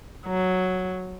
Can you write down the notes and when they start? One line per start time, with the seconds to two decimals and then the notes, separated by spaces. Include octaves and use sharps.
0.27 F#3